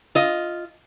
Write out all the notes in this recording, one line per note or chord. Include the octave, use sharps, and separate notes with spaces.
F4 D#5